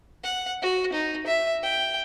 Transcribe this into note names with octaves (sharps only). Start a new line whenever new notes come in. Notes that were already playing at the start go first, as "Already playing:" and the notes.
F#5
F#4
D#4
E5
G5